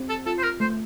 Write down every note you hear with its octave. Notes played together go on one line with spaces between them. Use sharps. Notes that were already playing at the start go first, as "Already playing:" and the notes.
Already playing: C4
A4
F4 A4
C5
A#4
A3 C5